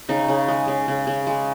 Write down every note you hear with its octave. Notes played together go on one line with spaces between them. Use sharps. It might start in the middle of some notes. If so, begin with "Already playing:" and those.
C#3 D#4
C#3
G#3
C#3
C#3
C#3
G#3